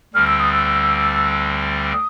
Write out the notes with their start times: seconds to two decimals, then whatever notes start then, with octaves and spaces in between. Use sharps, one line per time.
0.14 D2 D3 G3 C4 F6
0.27 E6
0.40 D#6
0.52 E6
1.93 D#6